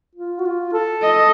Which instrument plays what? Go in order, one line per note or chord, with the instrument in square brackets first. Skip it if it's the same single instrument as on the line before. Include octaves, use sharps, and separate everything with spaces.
[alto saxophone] F4
F#4
F4
A4
[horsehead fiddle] D#5